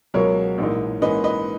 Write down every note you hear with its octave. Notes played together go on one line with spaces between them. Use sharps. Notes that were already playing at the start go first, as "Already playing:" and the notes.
C#2 B2 F#3 A#4 C#5
A#1 G#2 E3 A#3 D#4
G#2 E3 A#3 C#4 B4 D#5
B4 D#5